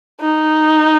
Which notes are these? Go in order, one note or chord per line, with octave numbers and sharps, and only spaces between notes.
D#4